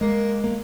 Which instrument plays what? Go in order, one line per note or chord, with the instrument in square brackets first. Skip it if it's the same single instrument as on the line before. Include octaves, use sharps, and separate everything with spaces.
[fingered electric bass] G#3 [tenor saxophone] A#3
[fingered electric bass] A#3